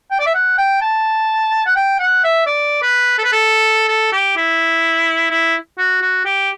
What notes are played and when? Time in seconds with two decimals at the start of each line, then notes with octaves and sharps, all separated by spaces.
0.11 G5
0.19 D5
0.26 E5
0.34 F#5
0.58 G5
0.82 A5
1.66 F#5
1.76 G5
1.99 F#5
2.24 E5
2.46 D5
2.82 B4
3.18 A4
3.24 B4
3.32 A4
3.88 A4
4.12 G4
4.37 E4
5.30 E4
5.78 F#4
6.02 F#4
6.25 G4